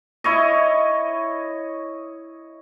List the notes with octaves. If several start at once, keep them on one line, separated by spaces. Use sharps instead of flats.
E4 C#5 D#5